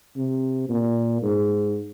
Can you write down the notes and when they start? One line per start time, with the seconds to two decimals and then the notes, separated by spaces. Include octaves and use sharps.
0.17 C3
0.69 A#2
1.23 G#2